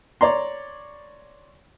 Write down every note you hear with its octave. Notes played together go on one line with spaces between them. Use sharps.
C#5 D5 A#5 C6